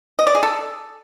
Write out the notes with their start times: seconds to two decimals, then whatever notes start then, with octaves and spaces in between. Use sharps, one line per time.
0.19 D#5
0.27 D5
0.35 G#4
0.43 A4